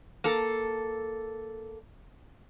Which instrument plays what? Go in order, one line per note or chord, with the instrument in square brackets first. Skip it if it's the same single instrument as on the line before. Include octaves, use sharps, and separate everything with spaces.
[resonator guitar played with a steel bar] A#3 A4